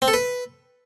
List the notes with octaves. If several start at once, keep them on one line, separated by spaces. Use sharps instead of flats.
C4
A4
B4